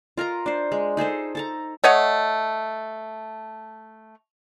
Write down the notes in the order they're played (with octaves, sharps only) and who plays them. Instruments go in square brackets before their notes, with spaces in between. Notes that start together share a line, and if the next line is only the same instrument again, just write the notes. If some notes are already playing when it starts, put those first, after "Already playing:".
[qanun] F4 A#4 D#5 A#5
D4 C5
G#3
D#4 G#4 A4 C5
A4 A5 A#5
[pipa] A3 C#5 D#5 F#5